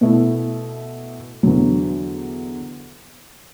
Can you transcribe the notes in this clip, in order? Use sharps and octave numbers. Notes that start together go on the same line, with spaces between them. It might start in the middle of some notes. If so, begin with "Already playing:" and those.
B2 A3 E4
E2 D3 F#3